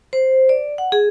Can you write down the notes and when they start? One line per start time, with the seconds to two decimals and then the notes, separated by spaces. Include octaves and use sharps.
0.13 C5
0.49 D5
0.78 F#5
0.92 G#4